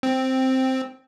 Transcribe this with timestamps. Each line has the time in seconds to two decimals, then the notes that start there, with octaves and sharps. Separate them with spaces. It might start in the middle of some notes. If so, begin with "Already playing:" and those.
0.03 C4